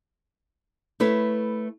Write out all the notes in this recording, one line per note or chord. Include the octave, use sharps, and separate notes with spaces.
A3 E4 B4 C#5